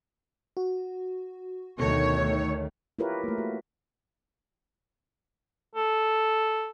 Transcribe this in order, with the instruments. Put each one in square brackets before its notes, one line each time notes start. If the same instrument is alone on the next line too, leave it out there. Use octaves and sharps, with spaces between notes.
[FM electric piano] F#4
[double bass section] D2 D#3 A3 [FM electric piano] B2 A4 [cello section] C#5
[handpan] E4 F4 G4 A#4 B4 C#5
A3 A#3
F#4
[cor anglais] A4